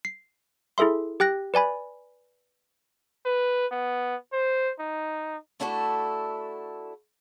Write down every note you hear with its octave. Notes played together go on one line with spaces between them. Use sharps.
C7
E4 G#4 A4 E5 C6
G4 G5 F#6 A#6
B4 D5 G#5 B5
B4
B3
C5
D#4
A3 D4 E4 F#4 A4